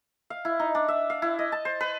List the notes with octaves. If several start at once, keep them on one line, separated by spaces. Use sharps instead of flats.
F5
E4
D#4
D4
E5
F5
E4
D#5
A5
C5
B4